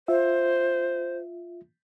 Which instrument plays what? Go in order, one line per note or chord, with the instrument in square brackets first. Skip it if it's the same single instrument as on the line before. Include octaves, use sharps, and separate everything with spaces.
[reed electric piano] F4 E5 [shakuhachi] C5